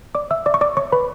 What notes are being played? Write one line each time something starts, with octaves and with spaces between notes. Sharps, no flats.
D5 D6
E5 E6
D5 D6
C#6
D5 D6
C#5 C#6
B4 B5